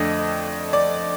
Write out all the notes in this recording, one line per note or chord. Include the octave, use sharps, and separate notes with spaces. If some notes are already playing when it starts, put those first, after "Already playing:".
Already playing: F2 D3 A3 D4 D#5
D5